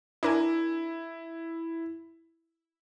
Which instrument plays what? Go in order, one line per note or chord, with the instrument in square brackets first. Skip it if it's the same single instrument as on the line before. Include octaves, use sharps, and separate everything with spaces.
[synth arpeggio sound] D4 A#4 G#5 [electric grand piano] E4